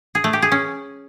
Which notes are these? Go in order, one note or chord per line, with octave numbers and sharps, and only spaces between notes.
G#4
A3
G4
G#4
C#4